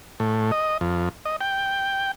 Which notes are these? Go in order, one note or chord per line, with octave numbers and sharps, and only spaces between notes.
A2
D#5
F2
D#5
G5